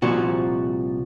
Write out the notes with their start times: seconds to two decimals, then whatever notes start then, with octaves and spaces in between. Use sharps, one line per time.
0.02 C2 A#2 F3 F#4